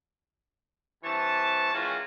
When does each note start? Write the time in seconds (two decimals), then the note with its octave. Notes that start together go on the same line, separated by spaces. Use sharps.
1.04 G2 E3 C4 C#5 A5
1.73 D#3 E3 G#3 C#4 F4 F#4